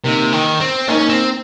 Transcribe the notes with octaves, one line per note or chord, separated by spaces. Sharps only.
C3 A#3 D#4 A#4
D#3
C4
A#3 C#4 D#4 A#4
C4